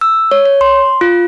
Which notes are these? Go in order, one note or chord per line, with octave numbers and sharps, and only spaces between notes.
E6
C#5
C#5
C6
F4